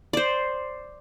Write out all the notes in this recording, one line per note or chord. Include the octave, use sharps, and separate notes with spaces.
C5 D5